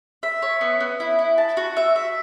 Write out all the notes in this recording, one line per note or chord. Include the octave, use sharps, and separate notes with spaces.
E5
C#5
B3
B3
E4
E4
A5
F#4
E5
E5